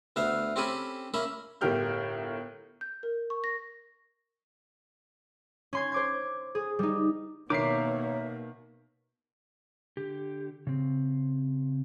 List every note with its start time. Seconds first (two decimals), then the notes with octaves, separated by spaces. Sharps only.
0.16 D2 B3 E5 F5
0.56 C4 C#4 G4 A4 G#5 B5
1.14 A#3 C#4 E5 B5
1.61 G1 A2 G4 A#4 F6 G6
2.81 G6
3.03 A#4
3.30 C#6
3.44 A#6
5.73 C#4 C6 G#6
5.92 C5 D6 G#6
6.55 G#4
6.79 G3 D#4
7.50 B2 D#3 A#3 C#5 E5 A#5 D6 C7
9.97 D3 G4
10.67 C#3 C4